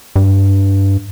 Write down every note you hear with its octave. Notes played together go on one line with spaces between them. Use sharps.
G2